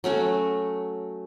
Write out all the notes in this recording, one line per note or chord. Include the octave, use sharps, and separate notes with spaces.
F#3 A3 C#4 F#4